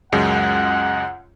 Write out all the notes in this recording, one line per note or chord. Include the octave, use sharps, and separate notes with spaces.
C#2 F#2 G#3 F#5